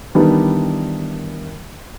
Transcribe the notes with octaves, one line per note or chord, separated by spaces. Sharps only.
D#3 E3 G3 B3 D4 D#4